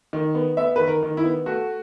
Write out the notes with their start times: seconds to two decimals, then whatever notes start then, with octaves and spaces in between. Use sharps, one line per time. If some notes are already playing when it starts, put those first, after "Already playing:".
0.13 D#3
0.35 B3
0.57 B3 E5
0.76 D#3 B4
0.88 A#4
1.03 D#3
1.17 E4
1.24 B3
1.46 A3 F#4